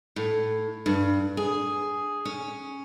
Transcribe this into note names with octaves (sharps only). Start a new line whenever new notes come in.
A2
G2
G#4
C#4